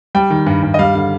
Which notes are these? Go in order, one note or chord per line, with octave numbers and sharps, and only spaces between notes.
G3 G5
D#3
G2
G2
D#5
G3 F5
D3 F5